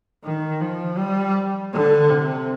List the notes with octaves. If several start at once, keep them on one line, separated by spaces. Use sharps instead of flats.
D#3
F3
G3
D3
C3